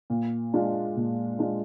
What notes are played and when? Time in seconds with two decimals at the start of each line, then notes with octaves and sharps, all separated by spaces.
0.10 A#2
0.53 G#3 D4 F4
0.97 A#2
1.39 G#3 D4 F4